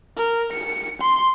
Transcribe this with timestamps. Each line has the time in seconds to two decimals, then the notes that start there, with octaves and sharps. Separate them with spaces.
0.17 A#4
0.53 C#7
1.02 C6